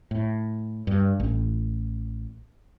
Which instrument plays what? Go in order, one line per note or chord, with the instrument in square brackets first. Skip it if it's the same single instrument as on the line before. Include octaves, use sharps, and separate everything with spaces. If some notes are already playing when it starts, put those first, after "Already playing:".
[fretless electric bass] A2
G2
A1